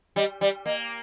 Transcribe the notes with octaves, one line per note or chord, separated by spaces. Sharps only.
G3 D#5
G3 D5
A#3 D#5